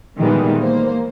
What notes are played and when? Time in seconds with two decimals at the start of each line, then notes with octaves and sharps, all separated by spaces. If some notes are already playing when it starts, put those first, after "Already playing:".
0.17 A#2 D#3 E3 G3 G#3 B3
0.59 A#3 C5